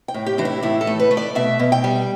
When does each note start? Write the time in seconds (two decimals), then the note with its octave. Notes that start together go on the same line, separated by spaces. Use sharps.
0.08 G5
0.14 A2
0.26 G4
0.38 E3 D4
0.45 E4
0.63 A2 E4
0.81 A4
0.87 A3
0.99 B4
1.11 A3
1.17 D5
1.35 B2 E5
1.59 B2
1.72 G5
1.84 G3